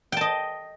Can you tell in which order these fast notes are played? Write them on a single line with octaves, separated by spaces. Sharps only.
G5 A5 D#5